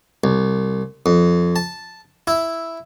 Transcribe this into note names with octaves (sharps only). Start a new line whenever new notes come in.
C2
F2
A5
E4